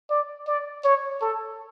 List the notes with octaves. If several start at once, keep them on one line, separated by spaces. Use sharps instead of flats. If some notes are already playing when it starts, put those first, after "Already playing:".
D5
D5
C#5
A4